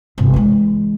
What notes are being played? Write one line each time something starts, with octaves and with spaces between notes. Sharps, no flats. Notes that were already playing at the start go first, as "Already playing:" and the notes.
G1 C3
E3 G#3